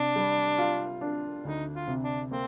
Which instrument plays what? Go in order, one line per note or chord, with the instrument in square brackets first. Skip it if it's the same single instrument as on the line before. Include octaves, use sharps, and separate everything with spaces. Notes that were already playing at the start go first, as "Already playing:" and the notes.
Already playing: [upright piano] C3 [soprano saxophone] D4
[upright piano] G3
F4
D4
[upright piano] D2 [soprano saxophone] D#4
[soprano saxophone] F4
[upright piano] C3
[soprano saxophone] D4
[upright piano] A#3 [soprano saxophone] C4